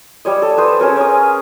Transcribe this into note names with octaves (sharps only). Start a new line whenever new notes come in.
G3 C#5 D#5
A4
B4 C5 D#6
C#4 G#4 A#4 C#5
C#5 D#6